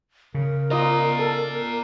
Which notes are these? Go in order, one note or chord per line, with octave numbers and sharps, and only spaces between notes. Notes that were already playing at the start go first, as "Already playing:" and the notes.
C#3 A#4
F4 D5 D#5 A#5
A4